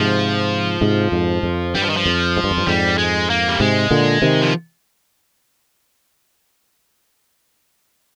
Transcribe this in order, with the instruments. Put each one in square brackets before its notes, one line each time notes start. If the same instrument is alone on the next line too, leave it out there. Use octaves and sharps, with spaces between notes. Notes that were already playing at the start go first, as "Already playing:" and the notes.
Already playing: [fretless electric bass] G#2 C3 [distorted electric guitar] F3
[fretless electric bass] G#2 C3
F2 G#2
F2
[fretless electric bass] G2 [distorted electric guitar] G3
[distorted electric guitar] F3
D#3
F3
[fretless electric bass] F2
G#2
G2
F2
G2
[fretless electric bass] F2 G#2 [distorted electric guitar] G3
[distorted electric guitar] G#3
A#3
G3
[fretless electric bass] G#2 C3 [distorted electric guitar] G#3
[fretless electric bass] A#2 D3
C3 D#3
[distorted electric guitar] F3